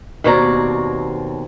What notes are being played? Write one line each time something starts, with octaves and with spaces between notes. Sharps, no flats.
D#2 B2 C4 C#5 D5 A#5